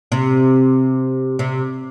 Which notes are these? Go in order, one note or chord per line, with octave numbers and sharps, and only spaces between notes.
C3
C3